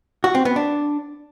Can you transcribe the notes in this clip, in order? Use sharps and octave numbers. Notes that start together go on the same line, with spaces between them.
F#4
C4
B3
D4